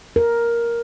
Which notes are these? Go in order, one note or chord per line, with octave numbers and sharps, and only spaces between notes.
A#4